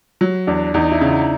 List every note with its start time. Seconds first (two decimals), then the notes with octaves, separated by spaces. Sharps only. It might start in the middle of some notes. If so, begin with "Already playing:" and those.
0.21 F#3
0.47 E2 D4
0.74 E2 D#4
0.92 E4
1.01 C#3
1.11 D#4